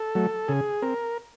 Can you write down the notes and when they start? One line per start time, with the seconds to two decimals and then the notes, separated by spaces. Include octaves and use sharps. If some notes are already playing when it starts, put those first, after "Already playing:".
Already playing: A4
0.15 F#3 A3
0.48 C#3 G#4
0.82 C4 A#4